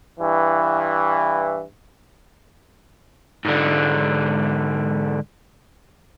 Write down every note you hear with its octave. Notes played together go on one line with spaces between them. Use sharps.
G2 E3
G#2 D3